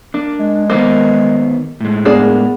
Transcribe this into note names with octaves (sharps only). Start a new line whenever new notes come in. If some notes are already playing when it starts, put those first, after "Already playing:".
A#3 D4
G#3
D#3 A#3 B3 C5
A2 G#3
A#3 B3 D4 G#4